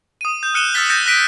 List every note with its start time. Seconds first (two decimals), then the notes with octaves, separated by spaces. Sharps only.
0.21 D#6 D#7
0.43 G6
0.54 F6 F#6 C#7 D#7 E7 G7
0.74 E6 F6 G6 A6 B6 G7
0.90 E6 G6 A6 A#6 C#7
1.06 F#6 A#6 B6 D7 D#7